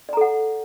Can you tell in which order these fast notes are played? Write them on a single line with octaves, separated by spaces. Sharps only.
D5 A#5 A4 F#5